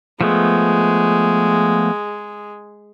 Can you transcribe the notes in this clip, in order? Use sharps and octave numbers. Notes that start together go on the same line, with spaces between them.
F3 G#3 A3 B3